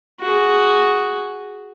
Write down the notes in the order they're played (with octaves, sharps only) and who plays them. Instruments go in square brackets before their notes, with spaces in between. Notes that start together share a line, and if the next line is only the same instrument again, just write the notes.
[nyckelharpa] F#4 G#4